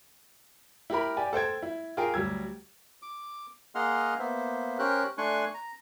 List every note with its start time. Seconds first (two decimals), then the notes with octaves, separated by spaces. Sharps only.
0.90 E4 G4 A#4 B5
1.17 G4 D5 G5 G#5
1.33 A4 C5 G5 G#6
1.63 E4
1.97 F4 G4 G#4 A#4 G5
2.14 D2 F#3 G3 E6 G#6
3.02 D6
3.75 A#3 G#4 D#5 F#5 C6 F6
4.19 A#3 B3 C5 E5
4.79 C#4 G4 A#4 C5 F#6
5.18 A3 D4 G#5 C6 C#6 F#6
5.54 A#5